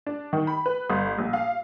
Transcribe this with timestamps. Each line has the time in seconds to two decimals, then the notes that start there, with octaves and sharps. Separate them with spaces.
0.07 D4
0.33 D#3
0.47 B5
0.66 B4
0.90 G1
1.18 A#1
1.33 F5